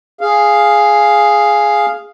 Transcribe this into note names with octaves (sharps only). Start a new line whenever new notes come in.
G#4 F5